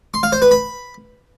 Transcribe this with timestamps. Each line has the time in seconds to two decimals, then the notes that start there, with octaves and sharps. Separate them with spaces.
0.14 C6
0.23 F5
0.32 C5
0.42 B4
0.51 B5